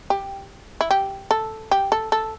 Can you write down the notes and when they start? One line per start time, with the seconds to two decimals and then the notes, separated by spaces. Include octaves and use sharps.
0.10 G4
0.81 E4
0.91 G4
1.31 A4
1.71 G4
1.92 A4
2.12 A4